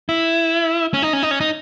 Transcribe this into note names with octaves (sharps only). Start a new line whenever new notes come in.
E4
C#4
D#4
C#4
D#4
C#4
D#4